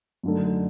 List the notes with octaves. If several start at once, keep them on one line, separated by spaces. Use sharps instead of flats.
F#2 D3 A3 D#4 A4